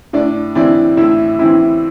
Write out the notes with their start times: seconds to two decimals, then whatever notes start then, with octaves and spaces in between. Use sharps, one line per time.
0.13 A2 D4 D5
0.55 E3 C4 D4 E4 D5
0.97 A2 E4 E5
1.39 E3 C4 E4